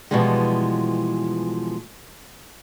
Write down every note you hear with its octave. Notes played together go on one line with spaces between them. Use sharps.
B2 E3 F3 G3 G#3